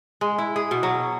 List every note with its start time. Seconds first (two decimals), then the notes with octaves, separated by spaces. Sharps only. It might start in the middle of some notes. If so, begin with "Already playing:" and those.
0.21 G#3
0.38 E4
0.56 G#4
0.71 B2
0.83 F#3